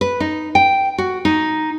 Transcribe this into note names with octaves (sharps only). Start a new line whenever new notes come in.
B4
D#4
G5
F#4
D#4